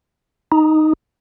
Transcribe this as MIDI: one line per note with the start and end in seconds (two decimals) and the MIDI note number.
0.52 0.93 63